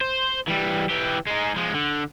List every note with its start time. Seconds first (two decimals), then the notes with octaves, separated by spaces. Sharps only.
0.01 C5
0.48 E3 G3
0.90 E3 G4
1.27 G#3 D#4
1.56 F3 G#3
1.74 D3